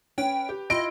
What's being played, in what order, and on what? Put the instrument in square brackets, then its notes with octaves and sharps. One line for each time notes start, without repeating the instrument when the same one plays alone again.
[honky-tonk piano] C#4 [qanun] B4 [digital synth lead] G5
[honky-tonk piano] G4
[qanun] E4 F4 [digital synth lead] D#5 [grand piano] D7